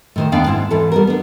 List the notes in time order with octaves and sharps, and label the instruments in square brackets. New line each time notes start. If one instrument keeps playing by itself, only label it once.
[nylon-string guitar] A2 D#3 C5
D#2 B3 D4 F5 G5
G#2 C4 E4
G#2 E3 A4
G3 B3 A#4
B3 D4